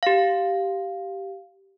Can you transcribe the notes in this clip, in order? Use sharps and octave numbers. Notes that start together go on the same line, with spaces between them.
G4 F5